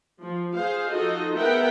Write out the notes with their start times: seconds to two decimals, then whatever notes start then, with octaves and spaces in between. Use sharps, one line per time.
0.21 F3
0.55 G#4 C5 F5
0.90 F3 D#4 F4 F#4 A4 D#5
1.37 B3 G#4 A#4 E5 F#5 G5